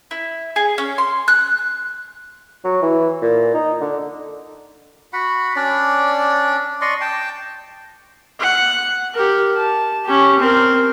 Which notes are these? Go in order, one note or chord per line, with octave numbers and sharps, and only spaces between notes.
E4
G#4
C#4
C6
F#6
F#3
E3
A#2
D#4
D3
F#4 F#5 B5
C#4 D4 D5
D5 D#5 C6 C#6
G5 A5
F#5
G4 A#4
A5
C#4 G4
C4 A#4